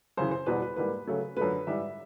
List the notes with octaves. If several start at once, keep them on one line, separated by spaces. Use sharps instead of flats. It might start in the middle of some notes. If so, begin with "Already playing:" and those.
F#2 C#3 E3 C5
C5
E2 B2 G3 B4
B4
G#2 E3 G3 A#3 B4
C#3 F#3 A3
F#2 D3 F3 A3 B4
G#2 E3 G3 E5